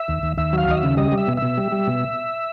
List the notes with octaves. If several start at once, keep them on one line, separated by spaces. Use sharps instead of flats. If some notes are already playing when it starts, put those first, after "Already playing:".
Already playing: E5
D#2
D#2
D#2 E5
F#3 F5
D#2 D#5
E5
C#3
G3 D#5
G3
E5
B2
E5
B2
G3
G3
B2